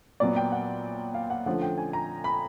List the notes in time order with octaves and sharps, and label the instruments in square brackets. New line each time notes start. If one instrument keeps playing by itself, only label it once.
[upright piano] A#2 F#3 B3 D5
G5
F#5
F5
F#5
D3 F3 A3 C#4 F#5
G5
G#5
A#5
B5